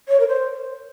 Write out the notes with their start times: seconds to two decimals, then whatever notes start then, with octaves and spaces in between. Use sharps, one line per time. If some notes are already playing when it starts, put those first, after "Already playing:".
0.08 C#5
0.20 A#4
0.28 C5